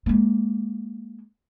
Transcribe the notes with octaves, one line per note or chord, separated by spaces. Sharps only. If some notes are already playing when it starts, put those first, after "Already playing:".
G#3 A#3